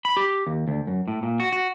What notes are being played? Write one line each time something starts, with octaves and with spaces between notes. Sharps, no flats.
B5
G4
D#2
D2
F#2
A2
A#2
F#4
F#4